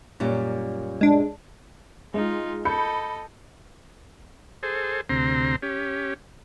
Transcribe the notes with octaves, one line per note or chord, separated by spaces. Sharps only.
F#2 A#2 G3
G#3 D4
G#3 D#4 F4
A4 D#5 B5 G6 C#7
G#4 A4 C5
D2 C3 C4 A#5 C6
C#4 G4